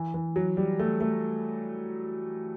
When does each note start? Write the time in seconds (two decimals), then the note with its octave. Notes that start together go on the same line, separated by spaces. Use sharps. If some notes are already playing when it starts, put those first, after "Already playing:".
Already playing: E3
0.14 E3
0.36 F#3
0.57 G3
0.79 A3
1.01 A3